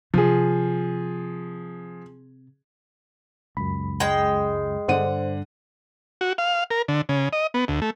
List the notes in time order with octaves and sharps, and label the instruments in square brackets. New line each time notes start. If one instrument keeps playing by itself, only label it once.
[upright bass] C3 [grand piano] F3 G#4
[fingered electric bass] C#2 [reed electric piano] F#2 B5
[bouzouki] G#3 G5
[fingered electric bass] G2 D4 [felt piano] D3 F#5 D#7 [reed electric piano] C5
[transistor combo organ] F#4
F5
A#4
D3
C#3
D#5
B3
D2
A3